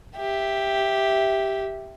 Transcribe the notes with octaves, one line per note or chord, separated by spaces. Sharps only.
G4 E5